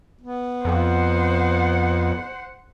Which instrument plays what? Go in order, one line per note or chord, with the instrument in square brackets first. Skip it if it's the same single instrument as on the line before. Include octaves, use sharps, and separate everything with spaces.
[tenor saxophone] B3
[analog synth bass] F2 [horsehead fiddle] C5 F#5